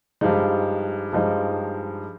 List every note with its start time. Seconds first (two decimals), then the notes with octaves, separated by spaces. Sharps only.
0.21 G2 F3 G#3 D#4
1.12 G2 F3 G#3 D#4